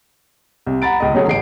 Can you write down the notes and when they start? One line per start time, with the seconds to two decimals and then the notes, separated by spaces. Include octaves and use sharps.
0.66 C2
0.82 F#5 A#5 B5 A6 D7
1.00 C#2 D#5
1.15 F#3 A3 C#4 G#4 C#5
1.28 A1 C7 D7